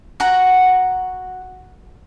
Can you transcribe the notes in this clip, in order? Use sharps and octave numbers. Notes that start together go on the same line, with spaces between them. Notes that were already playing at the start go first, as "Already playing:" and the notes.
F#4 F#5 A#5